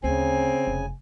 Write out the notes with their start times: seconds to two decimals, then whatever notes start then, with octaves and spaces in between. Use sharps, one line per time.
0.04 D2 C#3 C4 G#5
0.67 F1